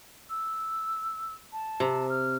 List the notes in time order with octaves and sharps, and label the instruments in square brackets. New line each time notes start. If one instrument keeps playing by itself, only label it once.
[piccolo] E6
A5
[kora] C3
[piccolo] F6